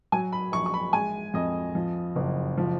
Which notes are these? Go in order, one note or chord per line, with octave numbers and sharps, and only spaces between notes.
F#3 G#5
B5
A#1 C#6
C#6
B5
G#3 G#5
F2 D#5
F3
F#1
F3